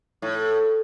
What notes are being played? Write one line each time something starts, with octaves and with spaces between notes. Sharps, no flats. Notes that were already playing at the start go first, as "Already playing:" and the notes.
A2